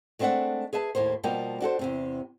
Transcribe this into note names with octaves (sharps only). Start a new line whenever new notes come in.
G#3 A3 C4 D4 E5 F#5
G#4 B4 E5 A5
D#2 A2 A#3 C5
B2 F3 G3 A#3 B3 G5
D4 F#4 A4 C5
E2 C3 C4